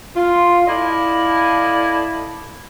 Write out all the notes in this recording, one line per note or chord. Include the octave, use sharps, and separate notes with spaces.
F4
E4 A4 D5 D#5 F5